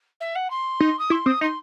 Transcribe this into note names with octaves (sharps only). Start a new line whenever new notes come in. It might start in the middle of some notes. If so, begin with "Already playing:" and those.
E5
F#5
C6
D#4
D#6
E4 C6
C4 D#6
D#4 C6